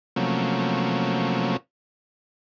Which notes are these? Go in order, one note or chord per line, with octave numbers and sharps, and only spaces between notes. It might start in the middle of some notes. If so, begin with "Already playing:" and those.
C3 F3 F#3 A3 A#3 C#4